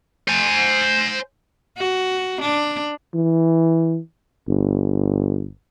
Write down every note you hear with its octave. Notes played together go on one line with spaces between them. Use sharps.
C5 G#5
F#4
D4
E3
G1